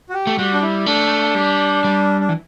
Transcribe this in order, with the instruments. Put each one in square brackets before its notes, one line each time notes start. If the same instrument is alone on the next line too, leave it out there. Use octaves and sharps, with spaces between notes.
[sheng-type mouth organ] F#4
G4
[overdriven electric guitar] A3
[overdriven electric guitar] G3 [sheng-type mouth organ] F#4
[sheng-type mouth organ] D4
E4
[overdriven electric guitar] A3 [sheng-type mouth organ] D4
[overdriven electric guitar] G3
G3
[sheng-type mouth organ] D4
[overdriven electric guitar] E3